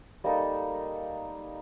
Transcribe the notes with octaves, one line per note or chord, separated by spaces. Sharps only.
G3 A#3 D#4 A4